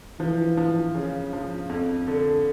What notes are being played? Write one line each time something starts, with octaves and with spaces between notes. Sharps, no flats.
E3 F3
F3
C#3
F3
F2
D3